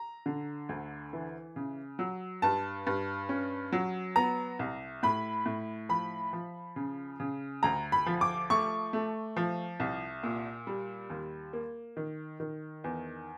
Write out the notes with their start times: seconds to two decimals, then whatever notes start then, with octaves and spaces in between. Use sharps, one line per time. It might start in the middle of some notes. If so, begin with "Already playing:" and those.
Already playing: A#5
0.26 D3
0.69 D2
1.13 E3
1.56 C#3
1.99 F#3
2.42 G2 A5
2.87 G2
3.29 C#4
3.72 F#3
4.16 B3 A#5
4.59 C2
5.03 A2 B5
5.46 A2
5.89 F3 B5
6.33 F3
6.76 C#3
7.20 C#3
7.63 D2 A#5
7.92 B5
8.06 F3
8.21 D6
8.50 A3 C#6
8.93 A3
9.37 F3
9.80 C2
10.23 A#2
10.67 G3
11.10 D#2
11.53 A#3
11.97 D#3
12.40 D#3
12.84 E2